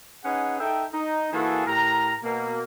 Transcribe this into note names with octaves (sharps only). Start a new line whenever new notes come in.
C#4 D#4 G#4 B4 F#5
D#4 A4 E5 G5
D#4
E3 A#3 F#4 G#4 A4
A2 G4 A#4 A#5
B2 A#3